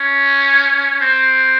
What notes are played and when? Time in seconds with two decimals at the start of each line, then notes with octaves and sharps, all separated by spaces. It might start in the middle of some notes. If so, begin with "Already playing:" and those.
Already playing: C#4
1.01 C4